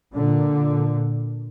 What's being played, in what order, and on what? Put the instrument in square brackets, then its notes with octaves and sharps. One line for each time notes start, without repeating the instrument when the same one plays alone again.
[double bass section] A#2 D3